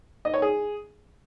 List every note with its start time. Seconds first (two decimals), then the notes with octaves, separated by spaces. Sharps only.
0.25 D#5
0.34 C#5
0.42 G#4